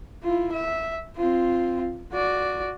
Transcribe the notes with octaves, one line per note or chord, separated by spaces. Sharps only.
E4 F4
E5
C4 F4
F#4 D5